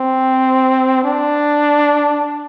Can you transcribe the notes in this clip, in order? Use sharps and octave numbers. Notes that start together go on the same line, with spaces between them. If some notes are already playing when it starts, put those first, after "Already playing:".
Already playing: C4
D4